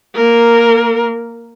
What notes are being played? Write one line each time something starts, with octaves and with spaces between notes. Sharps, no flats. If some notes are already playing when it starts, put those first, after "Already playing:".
A#3 A#4